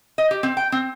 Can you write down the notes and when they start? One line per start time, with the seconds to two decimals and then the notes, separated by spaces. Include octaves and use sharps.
0.18 D#5
0.31 G4
0.43 C4
0.57 G5
0.72 C4